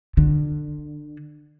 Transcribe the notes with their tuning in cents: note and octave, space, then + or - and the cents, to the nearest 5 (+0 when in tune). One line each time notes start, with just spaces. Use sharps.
D3 +25